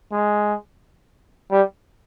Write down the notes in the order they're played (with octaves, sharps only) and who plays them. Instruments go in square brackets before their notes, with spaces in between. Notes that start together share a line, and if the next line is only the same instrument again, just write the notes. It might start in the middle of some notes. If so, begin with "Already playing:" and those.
[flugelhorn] G#3
G3